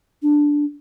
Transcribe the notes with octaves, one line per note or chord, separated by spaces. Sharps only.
D4